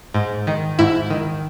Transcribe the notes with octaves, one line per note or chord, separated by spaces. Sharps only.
G#2
D#3
G#2 E4
D#3